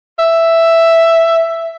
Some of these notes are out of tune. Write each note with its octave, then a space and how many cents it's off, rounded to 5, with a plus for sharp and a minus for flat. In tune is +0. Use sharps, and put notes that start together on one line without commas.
E5 +5